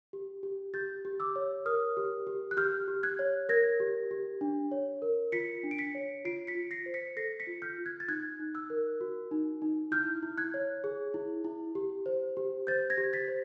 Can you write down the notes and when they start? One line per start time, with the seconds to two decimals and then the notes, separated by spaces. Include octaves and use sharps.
0.13 G4
0.43 G4
0.74 G4 G6 A6
1.05 G4
1.20 D6 E6
1.36 C#5
1.66 A#4 D#6 F6
1.97 G4
2.27 G4
2.51 F#6
2.57 G4 F6 G6
2.88 G4
3.03 F#6 G#6
3.19 C#5
3.49 A#4 G#6 A#6
3.80 G4
4.11 G4
4.41 D4
4.71 C#5
5.02 A#4
5.32 F4 B6 C#7
5.63 D4
5.71 D7
5.78 B6 C#7
5.95 C#5
6.25 F4 C7 D7
6.47 B6 C#7
6.55 F4
6.71 A#6 C7
6.86 C5
6.94 B6 C#7
7.17 A4 A#6 C7
7.40 B6 C#7
7.47 F4
7.62 F6 G6
7.78 F4
7.86 F#6 G#6
8.00 A6
8.08 D#4 F#6 G#6
8.40 D#4
8.55 E6 F#6
8.70 A#4
9.01 F#4
9.31 D#4
9.62 D#4
9.92 E4 F6 G6
10.23 E4
10.38 F#6 G#6
10.54 C#5
10.84 G#4
11.14 E4
11.45 E4
11.75 G4
12.06 C5
12.37 G4
12.67 C5 G6 A6
12.90 G#6 A#6
12.98 G4
13.13 A6 B6
13.28 C5